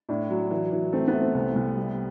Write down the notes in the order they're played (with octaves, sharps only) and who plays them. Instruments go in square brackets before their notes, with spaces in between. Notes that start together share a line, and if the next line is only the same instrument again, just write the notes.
[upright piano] A2 [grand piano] D4
[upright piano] F#3
E3
E3
[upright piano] A3 [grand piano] C4
[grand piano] B3
[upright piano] A3
[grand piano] C4
[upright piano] C2
C2
G3